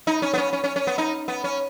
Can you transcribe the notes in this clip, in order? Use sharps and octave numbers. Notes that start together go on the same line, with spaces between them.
D#4
C#4
B3
C#4
C#4
C#4
C#4
B3
D#4
B3
C#4